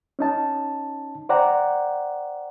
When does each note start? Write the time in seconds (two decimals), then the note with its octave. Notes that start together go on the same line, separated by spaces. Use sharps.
0.19 C#4 D#4 A5
1.29 C5 D5 F#5 G5 A#5